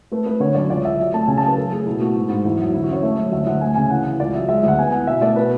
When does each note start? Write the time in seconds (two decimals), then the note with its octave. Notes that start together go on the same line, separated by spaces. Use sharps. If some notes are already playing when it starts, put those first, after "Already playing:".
0.12 A3 B4
0.26 A3 B4
0.40 D3 C#5
0.55 F#2 D5
0.69 C#2 D5
0.85 C#2 E5
0.99 F#3
1.14 A3 A5
1.28 C#3 G#5
1.38 A5
1.43 F#3 B4
1.57 F#2 A4
1.71 A3 G#4
1.86 B2 E4
2.01 A3 F#4
2.16 G#2
2.30 G#2
2.45 E2 E4
2.59 F#3
2.74 D3 E4
2.84 F#4
2.89 C#4 C#5
3.03 A3 E5
3.18 F#2
3.32 D2 E5
3.47 D2 F#5
3.61 A3 G#5
3.75 C#3 G#5
3.90 E3 F#5
4.05 E3
4.20 C#2 D5
4.35 F#3 E5
4.48 G#3 E5
4.63 D2 F#5
4.79 B3 G#5
4.92 E4 F#5
5.07 B2 E5
5.22 A3 D5
5.36 B2 B4